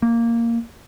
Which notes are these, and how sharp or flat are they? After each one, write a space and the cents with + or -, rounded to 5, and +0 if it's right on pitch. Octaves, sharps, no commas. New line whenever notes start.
A#3 -5